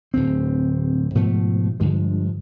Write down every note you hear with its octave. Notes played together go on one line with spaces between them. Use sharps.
D1 D2 C4
G#2 B2 F3 A3
G2 D3 F3 G#3